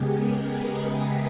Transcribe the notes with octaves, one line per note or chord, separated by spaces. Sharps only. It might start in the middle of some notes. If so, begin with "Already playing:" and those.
Already playing: C#3 G#3 B3 G4 G#4 A#4
B4
D#5
E5